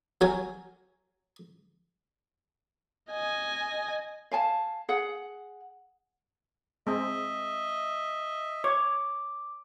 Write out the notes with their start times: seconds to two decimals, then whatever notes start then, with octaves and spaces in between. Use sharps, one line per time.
0.21 F#3 A#4 G#5
3.10 D#5 G#5
4.31 F5 G#5 A5
4.89 G#4 F#5
6.87 G#3 C4 D#5 E5
8.64 C#5 D6